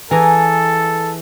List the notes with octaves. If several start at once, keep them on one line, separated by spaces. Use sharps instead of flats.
E3 G#4 A4 A#5